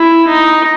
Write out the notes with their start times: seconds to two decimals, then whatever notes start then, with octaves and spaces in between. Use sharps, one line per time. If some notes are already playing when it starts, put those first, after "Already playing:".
Already playing: E4
0.27 D#4